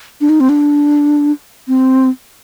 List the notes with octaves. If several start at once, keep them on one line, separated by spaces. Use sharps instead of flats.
D4
D#4
C4
D4
C4